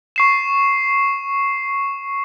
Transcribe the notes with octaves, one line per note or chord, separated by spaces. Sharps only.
C#6 C7 E7